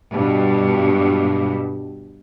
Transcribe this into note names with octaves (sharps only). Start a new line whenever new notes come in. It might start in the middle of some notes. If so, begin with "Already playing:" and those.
G2 B2